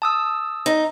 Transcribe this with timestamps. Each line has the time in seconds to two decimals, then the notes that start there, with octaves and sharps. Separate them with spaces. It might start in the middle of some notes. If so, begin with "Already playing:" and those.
0.02 A5 D#6 E6
0.66 D#4